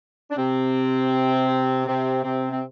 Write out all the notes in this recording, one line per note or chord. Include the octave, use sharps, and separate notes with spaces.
D4
C3 C4
C3 C4
C3 C4
C4